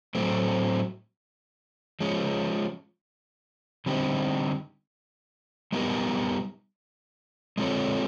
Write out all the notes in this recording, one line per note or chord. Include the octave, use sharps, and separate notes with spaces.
A2 F#3 A3 C4
F3 G#3 C#4
D3 G3 C4 D#4 G4
G3 B3 D#4 G4 A#4
G#3 C4 F4 A4 C#5